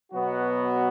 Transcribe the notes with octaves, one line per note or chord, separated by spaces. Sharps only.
B2 F#3 B3 F#4